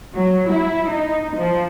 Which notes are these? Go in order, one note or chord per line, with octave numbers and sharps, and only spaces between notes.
F#3
E4
D#4
F3